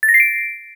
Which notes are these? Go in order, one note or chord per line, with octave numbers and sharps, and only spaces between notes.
A6
A#6
C7
D7